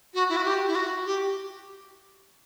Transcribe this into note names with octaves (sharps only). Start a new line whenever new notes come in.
F#4
E4
F#4
G4
E4
F#4
G4